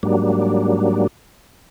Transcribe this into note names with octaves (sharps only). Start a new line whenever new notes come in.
G#2 F#3 G3 A#3 D4